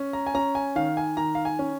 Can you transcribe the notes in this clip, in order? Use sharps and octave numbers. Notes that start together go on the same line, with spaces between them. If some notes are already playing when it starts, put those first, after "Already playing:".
Already playing: C#4
A#5
G#5
C#4 A#5
G#5
D#3 F5
G#5
D#3 A#5
F5
G#5
C#4